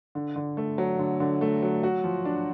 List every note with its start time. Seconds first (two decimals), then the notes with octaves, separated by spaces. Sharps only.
0.15 D3
0.36 D3
0.57 A3
0.78 F#3
0.99 D3
1.20 D3
1.41 A3
1.62 F#3
1.83 F#4
2.04 F3
2.25 D4